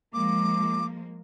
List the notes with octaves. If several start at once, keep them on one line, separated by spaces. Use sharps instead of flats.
F3 G#3 A#3 D6